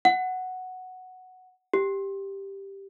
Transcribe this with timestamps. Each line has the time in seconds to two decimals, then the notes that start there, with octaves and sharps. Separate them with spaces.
0.05 F#5
1.74 G4